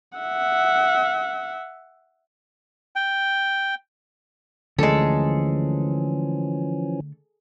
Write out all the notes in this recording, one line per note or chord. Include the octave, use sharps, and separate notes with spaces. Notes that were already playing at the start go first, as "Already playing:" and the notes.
E5 F#5
G5
D3 E3 F3 G#3 A3 C#4 A4